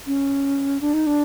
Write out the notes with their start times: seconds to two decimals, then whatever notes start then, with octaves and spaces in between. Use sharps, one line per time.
0.07 C#4
0.81 D4
0.94 D#4
1.07 D4